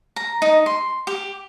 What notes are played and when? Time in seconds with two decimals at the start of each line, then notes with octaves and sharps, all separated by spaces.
0.16 A#5
0.42 D#4
0.66 C6
1.07 G4